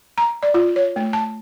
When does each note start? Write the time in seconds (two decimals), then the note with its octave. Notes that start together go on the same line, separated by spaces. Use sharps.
0.18 A#5
0.43 D5
0.54 F4
0.76 C#5
0.96 A3
1.13 A5